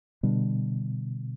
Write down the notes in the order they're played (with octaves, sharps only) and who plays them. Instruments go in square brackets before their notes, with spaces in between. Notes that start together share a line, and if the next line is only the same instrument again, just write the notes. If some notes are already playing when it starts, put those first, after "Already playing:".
[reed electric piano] B2 [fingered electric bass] D3 G3 D4